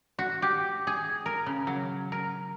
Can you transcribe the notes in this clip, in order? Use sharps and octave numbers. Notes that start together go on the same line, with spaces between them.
F#4
G4
G#4
A#4
C#3
F#3
A#4